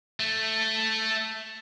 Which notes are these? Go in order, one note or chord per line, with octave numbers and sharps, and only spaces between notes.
A3